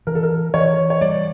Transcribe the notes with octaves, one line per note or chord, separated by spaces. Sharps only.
E3 A#4
A4
A#4
E3 C#5
C#5
G3 D5